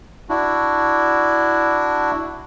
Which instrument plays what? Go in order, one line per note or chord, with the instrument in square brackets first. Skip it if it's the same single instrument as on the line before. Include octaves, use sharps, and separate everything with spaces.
[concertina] D4 E4 F#4